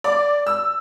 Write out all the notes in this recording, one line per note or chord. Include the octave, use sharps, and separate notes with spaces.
D5
E6